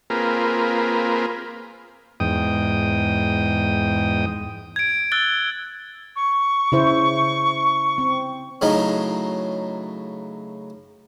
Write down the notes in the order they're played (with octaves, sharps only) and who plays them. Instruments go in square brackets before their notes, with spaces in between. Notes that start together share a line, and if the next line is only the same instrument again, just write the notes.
[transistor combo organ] A#3 C4 F4 G#4 A#4 B4
E2 G#2 G5 D#6
[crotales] G#6 D7
E6 F#6 A6 G7
[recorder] C#6
[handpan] C#3 E4 C5
C4
[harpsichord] A2 C#3 F#3 D#4